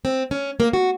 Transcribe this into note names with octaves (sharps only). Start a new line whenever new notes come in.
C4
C#4
A#3
F#4